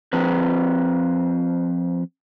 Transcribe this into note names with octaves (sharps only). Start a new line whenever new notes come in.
F3 C4 B4 C5